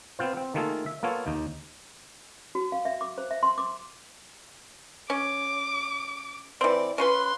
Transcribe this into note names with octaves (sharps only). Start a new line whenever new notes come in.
B3 C4 F4 C5
C4
D#3 A3 A#3 F4 G#4 A4
E5
A#3 B3 F4 A4 C#5
D#2 D#4
F#4
F5
E5
D6
C5
E5
C6
D6
C#4 D6
E3 C4 D5
C#4 F4 B4 C6